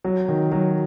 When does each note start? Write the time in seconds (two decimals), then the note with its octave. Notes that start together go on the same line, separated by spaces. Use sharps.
0.04 F#3
0.28 D#3
0.52 F#3